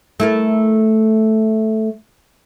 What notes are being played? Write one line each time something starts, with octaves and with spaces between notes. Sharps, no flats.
A3 E4 A#4